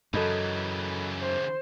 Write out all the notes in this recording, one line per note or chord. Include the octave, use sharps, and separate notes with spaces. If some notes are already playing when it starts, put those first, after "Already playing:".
F#2 C#3 E3 A4 D#5 B5
C5